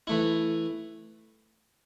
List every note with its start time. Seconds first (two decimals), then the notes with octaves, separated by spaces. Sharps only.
0.07 E3 A3 E4